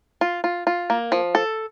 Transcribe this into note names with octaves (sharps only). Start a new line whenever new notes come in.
F4
F4
F4
A#3
F3
A4